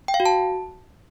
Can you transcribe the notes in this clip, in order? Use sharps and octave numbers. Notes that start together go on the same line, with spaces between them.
G5
F5
F#4
A5